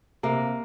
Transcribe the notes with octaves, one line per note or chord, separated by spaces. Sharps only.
C3 A#3